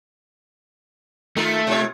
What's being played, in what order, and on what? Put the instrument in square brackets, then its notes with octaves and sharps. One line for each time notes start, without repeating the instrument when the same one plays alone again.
[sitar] D#3 F4 A#4 [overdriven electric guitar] A3
[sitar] B2 F4 C#5